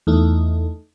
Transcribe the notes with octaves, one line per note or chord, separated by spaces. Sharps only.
E2 A3 D#4